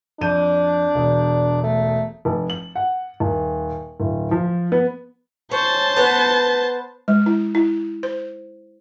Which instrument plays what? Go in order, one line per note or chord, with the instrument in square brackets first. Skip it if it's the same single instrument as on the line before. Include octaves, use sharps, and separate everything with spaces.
[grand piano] F2 G6 D#7 [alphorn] D4
[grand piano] E1
[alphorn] A3
[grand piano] F1
F#7
F#5
D#1
D1
F3
B3
[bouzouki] C#4 [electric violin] C5 A5
[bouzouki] B3 B4
[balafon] G#3
E4
E4
C5